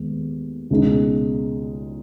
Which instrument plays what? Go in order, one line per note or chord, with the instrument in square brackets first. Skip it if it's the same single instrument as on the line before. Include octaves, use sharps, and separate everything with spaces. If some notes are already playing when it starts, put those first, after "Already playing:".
Already playing: [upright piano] D#2 D#3 G#3 B3
C#2 B2 G#3 D#4